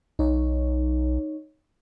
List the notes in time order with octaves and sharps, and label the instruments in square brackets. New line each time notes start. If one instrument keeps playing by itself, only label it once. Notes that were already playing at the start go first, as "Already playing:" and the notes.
[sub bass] B1 [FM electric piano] D#4 C#5